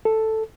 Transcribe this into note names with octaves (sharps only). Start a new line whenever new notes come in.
A4